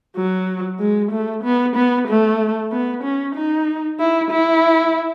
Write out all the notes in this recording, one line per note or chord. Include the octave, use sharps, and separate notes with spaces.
F#3
G#3
A3
B3
B3
A3
B3
C#4
D#4
E4
E4